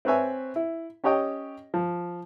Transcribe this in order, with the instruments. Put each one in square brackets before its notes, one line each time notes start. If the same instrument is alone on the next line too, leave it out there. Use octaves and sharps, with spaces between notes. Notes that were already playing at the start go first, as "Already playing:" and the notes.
[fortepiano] C4 B4 C#5 E5 G#5
E4
C#4 G4 C#5 D#5 G5
F3